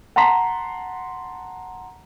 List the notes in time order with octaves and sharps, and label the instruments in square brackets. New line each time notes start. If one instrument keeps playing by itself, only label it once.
[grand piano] F#5 A5 A#5 C6 B6